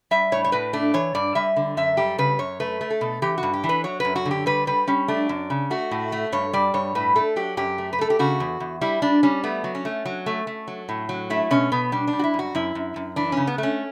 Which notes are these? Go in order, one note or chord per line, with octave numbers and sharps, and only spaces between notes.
G3 E5
A2 C#5
C#5
A2 B4
A3 D4
E3 C#5
G2 D5
G3 E5
D3
F#2 E5
G3 G4
C#3 B4
F#2 C#5
A3 B4
A3
A4
B2
E3 G4
F#4
G2
G4
E3
B4
F#3 C#5
F#2 B4
F#4
D3
G4
G3 B4
G3 B4
G3 C#4
A3 D4
F#2
C#3
A3 F#4
A2
A3
G2 C#5
G3 D5
G2 C#5
A2 B4
A3 A4
F#3 G4
F#2 G4
A3
B4
A3 A4
G4
C#3 F#4
E2
E2
G3 E4
G3 D4
G3 C#4
A3 B3
F#3
C#4
A3
F#3
A3
A3
F#3
A2
F#3
A3 E4
B2 C#4
B2 B3
G3 D4
D4
G3
F#4
E4
F#2
F#4
F#2 E4
F#2
F#2
E3 D4
C#3 C#4
B3
A3 C#4